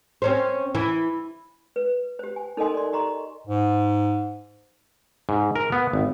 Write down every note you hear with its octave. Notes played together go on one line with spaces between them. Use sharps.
C4 C#4 C5
E3
B4
G4 C5
G#5
D#4 A4 A#4 D#5 G#5 C6
D5 C6
G4 D#5 A#5 C6 C#6
G#2
G#2
A#4
B3
G#1